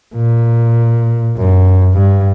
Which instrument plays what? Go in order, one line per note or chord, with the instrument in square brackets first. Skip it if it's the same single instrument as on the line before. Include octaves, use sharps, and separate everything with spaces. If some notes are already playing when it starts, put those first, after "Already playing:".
[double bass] A#2
F#2
G2